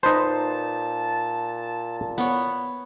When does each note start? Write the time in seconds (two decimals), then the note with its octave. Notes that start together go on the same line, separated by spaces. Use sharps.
0.03 A#2 D#4 B4 C5 A5
2.18 B3 C#5